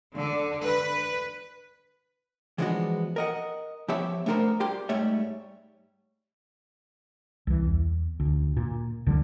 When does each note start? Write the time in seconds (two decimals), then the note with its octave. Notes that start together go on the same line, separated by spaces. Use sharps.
0.16 D3
0.64 B4
2.58 E3 F3 G#3 B3 D4 F#4
3.16 A#4 D#5 F#5
3.88 F3 B3 G4 C#5 E5
4.26 A3 B3 D4 F#4 A#4 C5
4.60 G3 G4 C6
4.89 G#2 G3 A3 C#5 E5
7.47 C2 E3
7.66 E2
8.20 D2
8.57 A#2
9.06 D2 D3 F3 G3